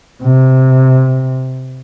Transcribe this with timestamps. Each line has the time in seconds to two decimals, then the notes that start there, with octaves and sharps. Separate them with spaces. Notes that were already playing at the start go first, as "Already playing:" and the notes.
0.23 C3